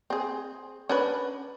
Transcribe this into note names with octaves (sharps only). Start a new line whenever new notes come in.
C4 G#4
C#4 D4 B4